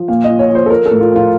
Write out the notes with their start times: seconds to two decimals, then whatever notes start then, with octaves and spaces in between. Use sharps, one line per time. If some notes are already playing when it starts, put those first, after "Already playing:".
Already playing: F3
0.08 A#2 F5
0.24 D#5
0.29 F3
0.39 C#5
0.49 F3
0.55 C5
0.66 A4
0.70 F3 A#4
0.86 A4
0.91 A2
1.00 F4
1.12 F3 F4